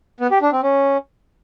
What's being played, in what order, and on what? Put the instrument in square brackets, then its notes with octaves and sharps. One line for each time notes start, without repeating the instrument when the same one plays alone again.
[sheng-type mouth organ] B3
G4
D4
C4
C#4